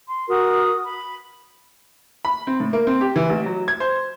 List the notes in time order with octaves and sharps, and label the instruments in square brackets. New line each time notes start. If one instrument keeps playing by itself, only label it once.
[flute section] C6
F#4 A#4 D#6
B5
[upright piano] B5
C4
A2
A#3
C4
G4
E3
A1
F#3
G#6
C5